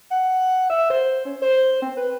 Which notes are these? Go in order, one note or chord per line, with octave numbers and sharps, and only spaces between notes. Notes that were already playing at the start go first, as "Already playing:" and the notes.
F#5
E5
C5
C#4
C5
C4
B4